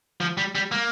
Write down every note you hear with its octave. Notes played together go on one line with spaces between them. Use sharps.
F3
G3
G3
A#3